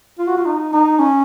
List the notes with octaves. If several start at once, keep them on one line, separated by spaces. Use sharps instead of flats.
F4
F#4
F4
D#4
D#4
C#4